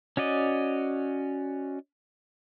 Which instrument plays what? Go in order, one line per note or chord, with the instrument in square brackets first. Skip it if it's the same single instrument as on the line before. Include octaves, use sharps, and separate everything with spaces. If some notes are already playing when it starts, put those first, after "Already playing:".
[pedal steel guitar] C#4 F#4 D5 D#5